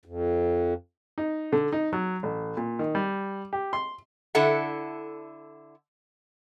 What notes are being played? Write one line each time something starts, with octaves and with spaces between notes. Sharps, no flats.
F2
D#4
D3
D#4
F#3
A1
A#2
D#3
G3
G4
C6
D3 E4 A4 E5 F#5